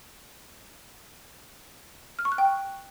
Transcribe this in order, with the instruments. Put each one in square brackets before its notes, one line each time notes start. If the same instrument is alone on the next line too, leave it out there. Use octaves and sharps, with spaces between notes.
[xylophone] F6
C#6
F#6
G5